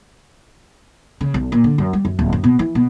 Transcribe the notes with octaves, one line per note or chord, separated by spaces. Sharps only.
C#3
B1
A#2
D3
F#2
G3
F#2
D1
F#2
B2
E3
B2